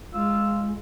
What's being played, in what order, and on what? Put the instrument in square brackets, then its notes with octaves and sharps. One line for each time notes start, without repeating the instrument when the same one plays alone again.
[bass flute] G#3 [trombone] F4 [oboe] E6